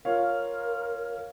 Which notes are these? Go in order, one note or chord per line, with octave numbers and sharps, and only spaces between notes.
F4 A#4 C#5 F5